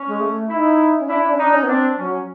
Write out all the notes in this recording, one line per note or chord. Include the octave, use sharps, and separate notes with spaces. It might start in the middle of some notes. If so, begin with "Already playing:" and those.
Already playing: C#4
G#3
A3
D#4 E4
C#4
D4 E4
D4
C#4
D4 D#4
C#4
B3
C4 D4
F#3 C#4